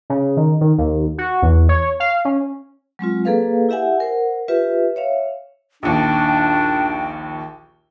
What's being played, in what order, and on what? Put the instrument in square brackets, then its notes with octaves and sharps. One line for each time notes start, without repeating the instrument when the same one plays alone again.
[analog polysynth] C#3
D#3
D#3
D#2
F#4
E2
C#5
F5
C#4
[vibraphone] F#3 G#3 C4 F4
A#3 G#4 A4 B4 F5
E4 G4 E5 F#5 G#5
A#4 C5 F#5
F4 G4 B4 E5
C#5 E5 F5
[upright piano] A#1 D#2 [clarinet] D4 [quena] G5